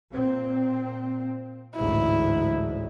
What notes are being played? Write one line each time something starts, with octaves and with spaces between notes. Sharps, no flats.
A#2 C4
A1 D2 G#2 E4